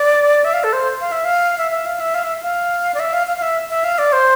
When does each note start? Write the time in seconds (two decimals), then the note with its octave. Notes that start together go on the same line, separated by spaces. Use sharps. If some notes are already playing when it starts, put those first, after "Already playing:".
Already playing: D5
0.45 E5
0.54 F5
0.64 A4
0.73 C5
1.00 F5
1.12 E5
1.25 F5
1.58 E5
1.71 E5
1.86 F5
2.00 E5
2.14 F5
2.24 E5
2.43 F5
2.94 D5
3.00 E5
3.13 F5
3.27 F5
3.38 F5
3.42 E5
3.70 E5
3.84 F5
3.98 D5
4.13 C5